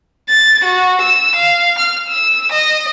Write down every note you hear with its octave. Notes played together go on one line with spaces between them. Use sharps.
A6
F#4
E6
F5
F6
E6
D#5